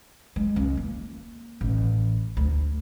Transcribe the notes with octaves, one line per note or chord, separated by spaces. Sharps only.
G#3
C#2
A#3
A1
D2